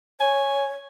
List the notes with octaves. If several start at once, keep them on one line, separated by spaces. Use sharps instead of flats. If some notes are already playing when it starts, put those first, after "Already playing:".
C#5 G#5